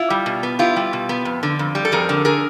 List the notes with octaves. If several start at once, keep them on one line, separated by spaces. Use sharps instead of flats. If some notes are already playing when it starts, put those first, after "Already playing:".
Already playing: E4 F4
G3
B2
B3
E4 F4 G4
G3
B2
B3
F2
D3
F2
G3
A4
F2 G#4 A#4
D3
G#4 A#4